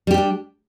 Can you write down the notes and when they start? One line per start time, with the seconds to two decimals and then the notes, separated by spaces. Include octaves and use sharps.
0.07 G3
0.11 G4
0.14 D#4
0.18 D4